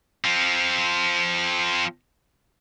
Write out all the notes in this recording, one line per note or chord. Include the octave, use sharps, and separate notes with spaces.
F3 C4